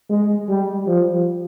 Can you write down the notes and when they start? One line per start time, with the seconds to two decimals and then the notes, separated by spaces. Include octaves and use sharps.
0.09 G#3
0.49 G3
0.87 F3